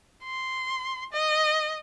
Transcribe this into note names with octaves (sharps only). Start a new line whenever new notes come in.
C6
D#5